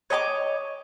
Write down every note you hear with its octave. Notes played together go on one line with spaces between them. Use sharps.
C#5 D#5 A5 D6